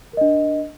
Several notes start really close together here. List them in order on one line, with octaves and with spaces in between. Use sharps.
A#4 D#5 D4